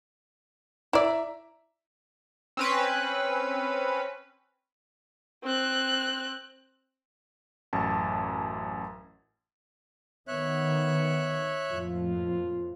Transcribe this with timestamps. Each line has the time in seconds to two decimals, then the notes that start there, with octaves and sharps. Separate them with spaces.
0.93 E4 D5 E5 A#5
2.57 C4 C#4 B4
5.44 C4 F#6
7.73 A1 F#2 A5
10.28 D#3 B3 C#5 E5 F#6
11.70 F2 A2 F3 A#3 F4